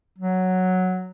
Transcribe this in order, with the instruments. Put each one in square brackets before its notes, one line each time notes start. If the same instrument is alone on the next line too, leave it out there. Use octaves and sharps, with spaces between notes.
[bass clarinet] F#3